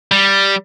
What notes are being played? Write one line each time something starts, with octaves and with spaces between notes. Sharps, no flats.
G3